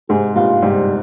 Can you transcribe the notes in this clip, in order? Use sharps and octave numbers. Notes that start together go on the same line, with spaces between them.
G#2 C3 G#4
G2 A#2 F4
G#2 C3 G3